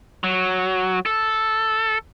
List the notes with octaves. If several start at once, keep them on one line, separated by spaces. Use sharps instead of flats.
F#3
A4